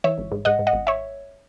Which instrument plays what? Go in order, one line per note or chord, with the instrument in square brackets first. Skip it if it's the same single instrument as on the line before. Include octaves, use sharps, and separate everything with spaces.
[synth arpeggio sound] E3 C#5 E5
G#1
G#2
G#2 D#5 F#5
G#2
D#5 F#5
G#1
C#5 E5